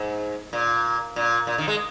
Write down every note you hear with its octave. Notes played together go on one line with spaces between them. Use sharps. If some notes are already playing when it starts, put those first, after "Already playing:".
Already playing: G#2
A#2
A#2
A#2
D#3
G#3